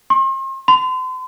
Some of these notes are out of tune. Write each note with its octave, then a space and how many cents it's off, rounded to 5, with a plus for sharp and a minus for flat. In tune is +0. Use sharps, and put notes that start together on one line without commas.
C6 +40
C6 -40